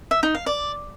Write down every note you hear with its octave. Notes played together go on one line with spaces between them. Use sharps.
E5
D#4
F5
D5